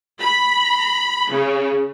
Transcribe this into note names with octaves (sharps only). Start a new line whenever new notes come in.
B5
C#3